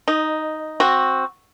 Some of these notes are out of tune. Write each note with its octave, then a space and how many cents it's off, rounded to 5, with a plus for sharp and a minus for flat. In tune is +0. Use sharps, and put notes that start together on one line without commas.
D#4 +0 D#5 -20
C4 +10 F#4 +0